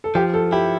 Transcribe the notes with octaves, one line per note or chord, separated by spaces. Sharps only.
A4
F3 G4
A4
E4 G4